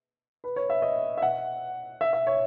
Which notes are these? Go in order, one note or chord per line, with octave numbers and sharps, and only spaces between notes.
B4
C#5
E5
D#5
E5
F#5
E5
E5
C#5